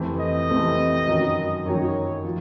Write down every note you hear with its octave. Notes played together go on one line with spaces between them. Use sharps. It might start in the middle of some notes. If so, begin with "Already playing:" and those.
Already playing: F2 C3 E3 A3 C4
D#5
F2 C3 E3 A3 C4
F#2 D#3 F#3
F#2 D#3 F#3 C#5
F3